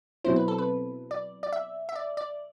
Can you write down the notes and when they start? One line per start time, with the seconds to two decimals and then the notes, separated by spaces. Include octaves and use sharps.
0.24 B2 F#3 C4 E4 C5
0.36 B4
0.48 A4
0.58 B4
1.11 D5
1.43 D5
1.53 E5
1.89 E5
1.96 D5
2.17 D5